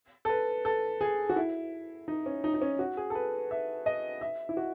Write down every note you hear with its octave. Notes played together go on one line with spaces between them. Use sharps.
A4
B4
A4
G#4
F#4
E4
D#4
C#4
D#4
D#4
C#4
F#4
G#4
A4
B4
E5
D#5
E5
E4
F#4